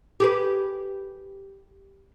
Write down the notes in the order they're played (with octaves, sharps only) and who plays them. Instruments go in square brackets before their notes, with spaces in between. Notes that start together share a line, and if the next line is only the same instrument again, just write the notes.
[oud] G4 G#4 B4